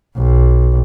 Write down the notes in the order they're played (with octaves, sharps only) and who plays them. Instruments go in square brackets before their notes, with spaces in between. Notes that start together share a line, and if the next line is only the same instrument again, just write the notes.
[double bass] B1